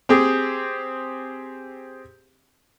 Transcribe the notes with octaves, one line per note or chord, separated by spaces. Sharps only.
C4 G4 G#4